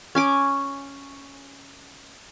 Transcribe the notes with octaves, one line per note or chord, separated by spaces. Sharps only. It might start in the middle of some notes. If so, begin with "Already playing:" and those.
C#4 G#5 D6